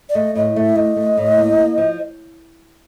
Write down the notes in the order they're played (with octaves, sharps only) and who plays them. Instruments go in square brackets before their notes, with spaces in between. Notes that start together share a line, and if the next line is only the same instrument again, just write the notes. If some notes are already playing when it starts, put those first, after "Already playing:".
[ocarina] D5
[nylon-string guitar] A3 [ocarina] D#5
[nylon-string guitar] A2 [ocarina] D#5
[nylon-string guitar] A3 [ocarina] E5
[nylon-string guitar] A3 [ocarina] D#5
[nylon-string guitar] A3
A2
A#3
A#3
F3